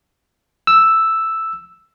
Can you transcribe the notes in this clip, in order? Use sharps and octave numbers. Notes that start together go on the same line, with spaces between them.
E6